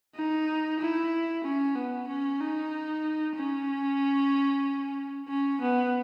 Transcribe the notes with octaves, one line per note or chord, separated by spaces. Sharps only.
D#4
E4
C#4
B3
C#4
D#4
C#4
C#4
B3